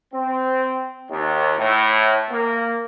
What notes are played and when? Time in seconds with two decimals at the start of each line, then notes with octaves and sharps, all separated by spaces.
0.13 C4
1.09 D#2
1.57 A2
2.30 A#3